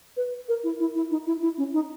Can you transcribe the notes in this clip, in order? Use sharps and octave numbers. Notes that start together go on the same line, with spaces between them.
B4
A#4
E4
E4
E4
D#4
E4
E4
C#4
D#4